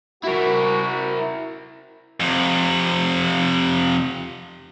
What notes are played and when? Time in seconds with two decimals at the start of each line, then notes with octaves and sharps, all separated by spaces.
0.24 E4 F#4 A#4
2.20 F2 C3